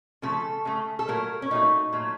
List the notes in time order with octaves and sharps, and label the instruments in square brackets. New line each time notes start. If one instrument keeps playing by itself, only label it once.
[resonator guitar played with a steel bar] C#3 F3 A3 A4
C#3 A3
A4
A#2 F#3 A3 A#4
C#4
A#2 F#3 A3 D#4
A#2 F#3 A3